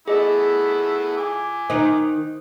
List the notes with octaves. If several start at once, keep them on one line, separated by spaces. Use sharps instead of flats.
A3 B3 E4 G#4 D#5
G#5 D6
D#3 D#4 C5